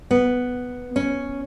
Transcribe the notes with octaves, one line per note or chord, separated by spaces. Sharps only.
B3
C#4